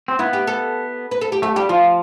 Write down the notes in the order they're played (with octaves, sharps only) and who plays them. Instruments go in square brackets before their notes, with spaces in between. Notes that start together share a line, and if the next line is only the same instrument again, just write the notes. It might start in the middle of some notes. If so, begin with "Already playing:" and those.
[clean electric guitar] C4
[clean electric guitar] B3 [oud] E4
[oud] G4
A4
B4
A4
G4
[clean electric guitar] A3 [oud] G4
[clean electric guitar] G3 [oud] G4
[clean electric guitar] F3 [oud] F4